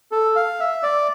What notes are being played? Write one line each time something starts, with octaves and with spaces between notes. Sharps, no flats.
A4
F5
E5
D5